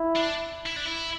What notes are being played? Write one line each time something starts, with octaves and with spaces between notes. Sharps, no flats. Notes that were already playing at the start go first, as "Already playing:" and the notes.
Already playing: E4
D4
E4
D4
E4